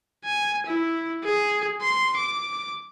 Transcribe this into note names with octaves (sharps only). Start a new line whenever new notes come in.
G#5
E4
G#4
C6
D6